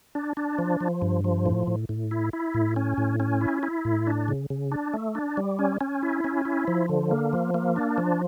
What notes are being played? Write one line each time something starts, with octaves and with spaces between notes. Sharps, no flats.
D4
D4
F3
F3
G2
F3
A2
A2
A2
E4
E4
A2
C#4
A2
C#4
E4
E4
A2
D4
C#3
C#3
D4
A3
D4
G3
C#4
C#4
E4
C#4
E4
F3
D3
A#3
F3
A#3
D4
F3